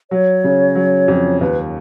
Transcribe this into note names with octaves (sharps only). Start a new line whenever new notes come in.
F#3 C#5
C#3
F#3
F2
D#2 B4